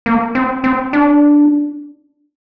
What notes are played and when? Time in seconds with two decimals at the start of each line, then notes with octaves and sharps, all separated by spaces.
0.06 A#3
0.35 C4
0.64 C4
0.93 D4